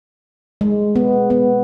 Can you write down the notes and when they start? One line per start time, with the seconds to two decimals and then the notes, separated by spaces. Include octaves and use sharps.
0.61 G#3
0.96 B3
1.30 B3